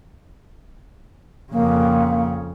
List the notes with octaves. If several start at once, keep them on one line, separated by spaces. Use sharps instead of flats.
F2 C#3 A#3